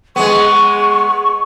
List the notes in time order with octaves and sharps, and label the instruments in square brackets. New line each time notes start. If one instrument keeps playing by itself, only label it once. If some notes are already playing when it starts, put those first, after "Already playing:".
[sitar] G#3 B3 [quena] C#6